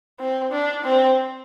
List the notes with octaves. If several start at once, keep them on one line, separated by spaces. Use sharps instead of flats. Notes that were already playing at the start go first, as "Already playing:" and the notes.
C4
D4
C4